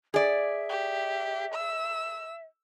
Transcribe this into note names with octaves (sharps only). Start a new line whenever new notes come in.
G#4 D5 E5
G4
E6